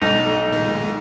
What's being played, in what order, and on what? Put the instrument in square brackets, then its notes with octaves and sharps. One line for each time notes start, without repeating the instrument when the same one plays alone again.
[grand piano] B1 [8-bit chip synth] F#3 A3 D4 [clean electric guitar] D#4
[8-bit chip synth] A#2 D#3 G#3